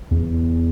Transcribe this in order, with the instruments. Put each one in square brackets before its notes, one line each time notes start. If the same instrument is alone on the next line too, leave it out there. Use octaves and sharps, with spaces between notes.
[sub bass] E2